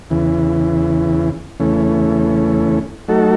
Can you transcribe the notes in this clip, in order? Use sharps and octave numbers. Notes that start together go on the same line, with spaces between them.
E2 C#3 E3
E2 C#3 E3 A3 C#4
F#3 A3 D#4 F#4 A4